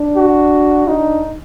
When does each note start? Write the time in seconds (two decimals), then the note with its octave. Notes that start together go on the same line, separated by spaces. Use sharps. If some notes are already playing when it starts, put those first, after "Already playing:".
Already playing: D4
0.16 F#4
0.88 D4 D#4